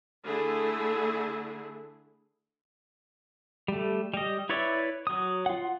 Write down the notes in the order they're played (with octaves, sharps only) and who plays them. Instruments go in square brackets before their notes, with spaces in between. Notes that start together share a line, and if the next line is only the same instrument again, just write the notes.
[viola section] D3 A3 E4 G#4
[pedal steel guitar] G3 A3
G3 D#5
E4 B4 C#5 D5 E5
F#3 D#6
F4 F#5